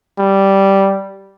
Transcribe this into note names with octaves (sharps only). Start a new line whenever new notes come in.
G3